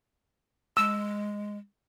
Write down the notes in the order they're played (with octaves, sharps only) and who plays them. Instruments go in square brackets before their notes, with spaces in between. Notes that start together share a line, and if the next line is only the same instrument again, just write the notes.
[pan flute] G#3 [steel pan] E6